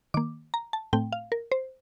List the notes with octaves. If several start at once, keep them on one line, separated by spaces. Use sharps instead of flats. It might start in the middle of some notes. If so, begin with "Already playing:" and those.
D#3 A#3 D6
A#5
A5
A2 A3 C4 G5
F5
A#4
C5